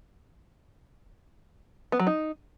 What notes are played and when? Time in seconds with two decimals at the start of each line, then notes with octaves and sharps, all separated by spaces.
1.92 B3
2.00 F#3
2.07 D#4